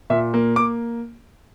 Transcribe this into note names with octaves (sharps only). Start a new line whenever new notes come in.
A#2 E5
A#3
A#3 D6